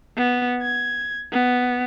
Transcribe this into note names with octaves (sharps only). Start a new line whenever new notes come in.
B3
G#6
B3